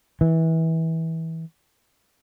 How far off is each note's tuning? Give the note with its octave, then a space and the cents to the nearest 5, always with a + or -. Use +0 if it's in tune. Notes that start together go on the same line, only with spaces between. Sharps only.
E3 -25